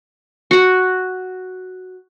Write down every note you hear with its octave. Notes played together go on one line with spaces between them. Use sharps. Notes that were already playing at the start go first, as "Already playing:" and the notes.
F#4 F#5